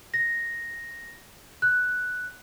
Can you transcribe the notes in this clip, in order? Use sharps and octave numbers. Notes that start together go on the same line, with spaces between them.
A#6
F#6